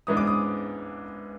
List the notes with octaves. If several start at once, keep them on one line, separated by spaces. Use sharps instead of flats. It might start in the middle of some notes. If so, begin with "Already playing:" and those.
G#2 E3 G#3 B3 D4 D#6
D6
D#6